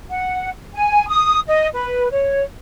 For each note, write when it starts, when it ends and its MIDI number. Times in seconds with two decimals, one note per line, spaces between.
0.10 0.50 78
0.74 1.07 80
1.08 1.40 87
1.48 1.68 75
1.74 2.09 71
2.11 2.44 73